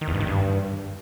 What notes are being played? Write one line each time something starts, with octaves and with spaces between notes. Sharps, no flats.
D#3
E2
G2
D#3
G2